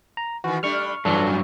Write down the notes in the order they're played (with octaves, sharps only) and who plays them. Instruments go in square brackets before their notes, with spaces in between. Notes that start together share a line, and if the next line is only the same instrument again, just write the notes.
[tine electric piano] A#5
[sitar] D#3 E3 [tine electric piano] F#4
[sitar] G3 A3 D4 [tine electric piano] C#6 F6
[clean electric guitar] G2 F#3 [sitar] E3 F4 [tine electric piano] D4 A4
[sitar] F2 A2